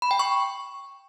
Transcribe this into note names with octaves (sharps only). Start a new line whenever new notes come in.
B5
G5
C#6